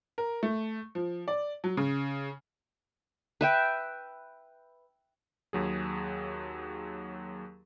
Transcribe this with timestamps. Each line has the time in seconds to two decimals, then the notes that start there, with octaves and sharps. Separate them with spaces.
0.18 A#4
0.43 A3
0.95 F3
1.28 D5
1.64 F#3
1.77 C#3
3.41 B4 E5 G5
5.53 D#2 F#3 G#4